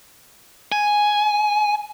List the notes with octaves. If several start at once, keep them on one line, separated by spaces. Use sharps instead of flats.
G#5